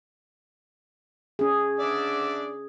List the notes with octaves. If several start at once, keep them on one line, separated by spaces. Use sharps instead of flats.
C#4 G#4
D4 D5 E5